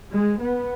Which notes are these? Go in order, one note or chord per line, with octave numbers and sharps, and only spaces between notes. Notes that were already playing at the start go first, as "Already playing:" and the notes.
G#3
B3